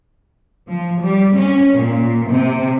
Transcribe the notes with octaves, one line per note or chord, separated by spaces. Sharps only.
F3
G3
C#4
A#2
C3